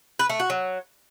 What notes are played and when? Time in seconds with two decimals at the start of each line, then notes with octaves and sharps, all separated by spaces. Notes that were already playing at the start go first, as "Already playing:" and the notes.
0.19 B4
0.29 A3
0.40 F#4
0.50 F#3